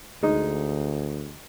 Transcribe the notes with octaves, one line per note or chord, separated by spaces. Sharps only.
D2 G#3 D#4